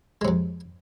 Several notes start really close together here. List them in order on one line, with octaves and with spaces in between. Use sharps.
G#3 C3 F2